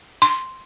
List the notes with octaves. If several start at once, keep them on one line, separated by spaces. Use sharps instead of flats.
C6